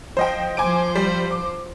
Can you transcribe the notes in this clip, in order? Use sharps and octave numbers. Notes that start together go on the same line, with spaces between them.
F3 C5 D#5 G5
F3 C5 G#5 D6 D7
G3
D6